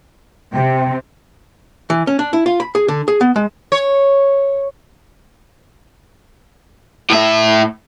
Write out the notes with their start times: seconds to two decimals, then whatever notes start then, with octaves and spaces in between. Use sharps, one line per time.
0.53 C3 G5
1.90 E3
2.07 C#4
2.19 D4
2.33 E4
2.46 F4
2.60 B5
2.75 G#4
2.88 D3
3.08 G#4
3.21 B3
3.36 G#3
3.72 C#5
7.10 A2 E5